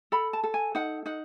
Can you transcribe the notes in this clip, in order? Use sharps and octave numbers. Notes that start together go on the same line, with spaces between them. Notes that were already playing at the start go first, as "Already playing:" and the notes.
A4 B5
A5
A4
G#5
D#4 F#5
D#4 F#5